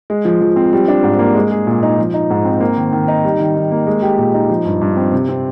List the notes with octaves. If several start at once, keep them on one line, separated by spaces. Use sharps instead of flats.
G#3
F3
F3
C4
G3
D4
G#2
A#3
G#3
G#4
A#2
D#4
F3
D#4
G#2
C4
A#3
D#3
D#3
D#4
G3
D#3
D#3
A#3
G#3
G4
A#2
D#4
F3
G2
G2
C4
C3
C4